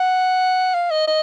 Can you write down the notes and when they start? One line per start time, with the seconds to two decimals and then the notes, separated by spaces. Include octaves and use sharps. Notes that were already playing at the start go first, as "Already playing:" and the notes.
Already playing: F#5
0.74 F5
0.90 D#5
1.07 D#5